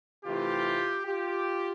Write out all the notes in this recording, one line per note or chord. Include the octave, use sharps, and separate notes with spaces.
C3 E3 A3 F4 G4
F4 G4